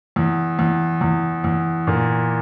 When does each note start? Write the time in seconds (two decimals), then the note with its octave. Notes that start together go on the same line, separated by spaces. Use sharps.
0.16 E2
0.59 E2
1.01 E2
1.44 E2
1.87 A#2